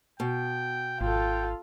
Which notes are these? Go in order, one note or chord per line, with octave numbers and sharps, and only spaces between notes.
B2 G5
G#1 F4 A4 G5